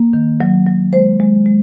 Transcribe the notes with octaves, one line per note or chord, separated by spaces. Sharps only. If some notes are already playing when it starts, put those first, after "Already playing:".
Already playing: A#3
D#3
F#3
F#3
G#3 C5
G#3
G#3